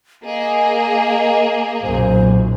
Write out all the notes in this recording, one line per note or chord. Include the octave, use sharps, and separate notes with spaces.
A#3 G#4 D#5
B1 F#2 A#2 C5